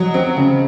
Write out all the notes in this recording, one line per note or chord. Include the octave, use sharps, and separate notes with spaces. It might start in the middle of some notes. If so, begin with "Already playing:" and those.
Already playing: F#3 D#5
C4
C#3